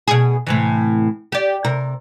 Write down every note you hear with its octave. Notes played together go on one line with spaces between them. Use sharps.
B2 G#4
A2 C3 E3
G4 D5
C3 A#4